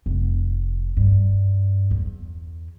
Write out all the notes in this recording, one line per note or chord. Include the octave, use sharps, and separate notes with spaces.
F1
G2
E2